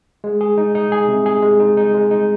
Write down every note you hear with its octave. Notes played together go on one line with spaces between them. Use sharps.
G#3
G#4
D#4
D#4
G#4
C3
G#4
G#3
D#4
D#4
G#3
D#4